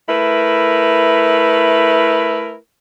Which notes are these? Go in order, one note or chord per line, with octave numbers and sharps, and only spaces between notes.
A3 E4 A#4 B4